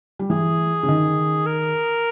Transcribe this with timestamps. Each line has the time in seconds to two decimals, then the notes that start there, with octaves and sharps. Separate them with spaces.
0.19 G3
0.30 E3 G#4
0.83 C#3
0.88 D#3
1.46 A#4